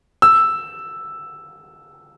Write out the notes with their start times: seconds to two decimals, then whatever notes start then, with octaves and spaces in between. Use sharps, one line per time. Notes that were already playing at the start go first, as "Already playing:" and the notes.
0.22 E6